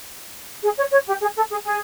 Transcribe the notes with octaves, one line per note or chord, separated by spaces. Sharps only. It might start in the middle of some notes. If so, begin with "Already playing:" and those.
G#4
C#5
C#5
G4
G#4
A4
G#4
G#4